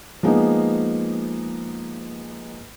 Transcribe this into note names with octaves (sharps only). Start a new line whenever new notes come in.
F3 G#3 A#3 B3 D#4